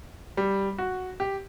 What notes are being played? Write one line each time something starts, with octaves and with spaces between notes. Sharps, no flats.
G3
F#4
G4